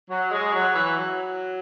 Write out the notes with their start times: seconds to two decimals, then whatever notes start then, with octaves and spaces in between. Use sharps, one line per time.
0.09 F#3
0.31 G#3
0.53 F#3
0.74 E3
0.96 F#3